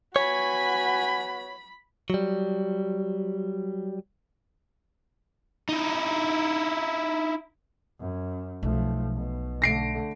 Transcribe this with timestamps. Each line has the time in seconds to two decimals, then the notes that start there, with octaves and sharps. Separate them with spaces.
0.16 B3 F#4 C#5 G#5 B5
2.10 F#3 G3
5.69 D#4 E4
7.99 F#2
8.63 B1 F3 A3
9.15 B2
9.62 D3 A3 A#6 C7 D7